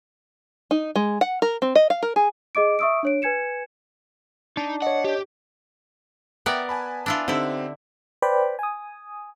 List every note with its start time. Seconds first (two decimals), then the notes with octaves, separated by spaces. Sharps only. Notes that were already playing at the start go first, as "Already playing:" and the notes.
0.71 D#4
0.96 G#3
1.21 F#5
1.42 A#4
1.62 C4
1.75 D#5
1.90 F5
2.03 A#4
2.16 G#4
2.55 G#4 D#5 D6 D7
2.79 E5 C#6 D#6 E6 D7
3.03 D4 C#5 D7
3.22 B4 G#5 G#6 C#7 E7
4.57 D4 D#4
4.82 C#5 D#5 F#5
5.04 G4
6.46 B3 A#4 D5 E5 G5 F#6
6.69 G#5 A5 B5
7.06 D4 E4 F4
7.28 D3 C4 D#4 E4 G4
8.22 B4 C5 D5 G5 B5
8.59 G#5 D#6